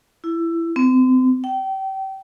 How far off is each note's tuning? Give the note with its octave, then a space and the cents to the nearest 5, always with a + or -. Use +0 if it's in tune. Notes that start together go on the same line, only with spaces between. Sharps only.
E4 +20
C4 -35
G5 -30